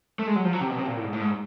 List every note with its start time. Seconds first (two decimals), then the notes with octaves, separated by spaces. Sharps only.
0.19 A3
0.27 G#3
0.36 F#3
0.45 F3
0.53 F#3
0.61 C3
0.70 B2
0.78 C3
0.87 A#2
0.96 A2
1.04 G#2
1.13 A2
1.21 G#2